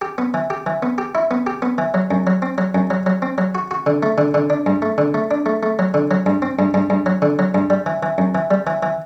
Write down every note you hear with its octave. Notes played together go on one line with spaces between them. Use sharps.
G4
B3
E3
G4
E3
B3
G4
E4
B3
G4
B3
E3
F#3
F#2
F#3
C4
F#3
F#2
F#3
F#3
C4
F#3
F#4
F#4
D3
A3
D3
D3
D4
G2
A3
D3
A3
D4
A3
A3
F#3
D3
F#3
G2
C4
G2
G2
G2
F#3
D3
F#3
G2
G3
E3
E3
F#2
E3
G3
E3
E3